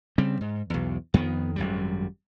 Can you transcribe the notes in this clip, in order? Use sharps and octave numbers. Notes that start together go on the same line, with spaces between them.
C#3 G3 C4
G#2
B1 E2
F2 D#3 B3
G#1 F#2 G3